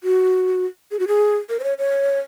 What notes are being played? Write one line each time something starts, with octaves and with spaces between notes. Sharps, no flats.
F#4
G#4
F#4
G#4
A#4
C5
C#5
C#5